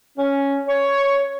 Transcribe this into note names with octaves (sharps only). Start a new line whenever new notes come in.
C#4
C#5